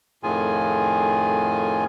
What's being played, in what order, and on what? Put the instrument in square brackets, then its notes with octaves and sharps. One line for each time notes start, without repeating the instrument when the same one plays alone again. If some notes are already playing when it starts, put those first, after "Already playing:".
[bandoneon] F2 A2 D#3 F4 G#4 G#5